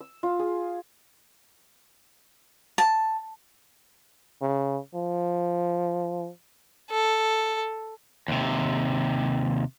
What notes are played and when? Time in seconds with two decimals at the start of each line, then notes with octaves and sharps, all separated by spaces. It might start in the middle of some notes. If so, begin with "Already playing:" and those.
0.01 E6
0.23 F4
0.39 G#4
2.78 A5
4.42 C#3
4.94 F3
6.91 A4
8.28 D#2 C3